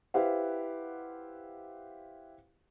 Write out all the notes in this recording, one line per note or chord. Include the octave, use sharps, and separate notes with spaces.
E4 G4 B4 C5 F5 F#5